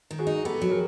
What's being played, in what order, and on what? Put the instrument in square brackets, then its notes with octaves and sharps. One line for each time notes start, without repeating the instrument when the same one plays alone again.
[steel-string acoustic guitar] D#3
[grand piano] F#4 G#4
[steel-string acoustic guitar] D#4
[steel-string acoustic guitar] B3 [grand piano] G4 A4
[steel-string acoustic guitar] F#3
[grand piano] G#4 A#4